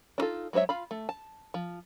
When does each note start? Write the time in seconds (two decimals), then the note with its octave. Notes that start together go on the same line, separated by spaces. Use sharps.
0.18 D4 D#4 F4 A4
0.53 F#3 G#3 C5 C#5 E5
0.69 F4 F5 B5
0.91 A3
1.09 A5
1.54 F3